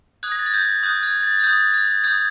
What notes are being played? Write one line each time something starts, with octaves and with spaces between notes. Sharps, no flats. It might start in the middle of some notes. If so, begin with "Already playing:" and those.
D#6 F#6 G#6
A#6
A6
G#6
G6
D#6 F#6 G6
G#6
A6
G#6
D#6 G6 A6
G#6
D#6 G6 G#6